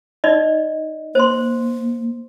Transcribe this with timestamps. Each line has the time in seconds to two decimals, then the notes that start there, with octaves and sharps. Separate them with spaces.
0.24 D#4 D5 D#5
1.15 A#3 C5 C6